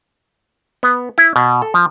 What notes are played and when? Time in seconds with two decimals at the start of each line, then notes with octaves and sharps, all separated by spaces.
0.83 B3
1.18 E4
1.36 B2
1.62 A4
1.74 F3